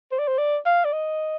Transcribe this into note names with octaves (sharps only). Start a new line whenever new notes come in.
C5
D5
C5
D5
F5
D5
D#5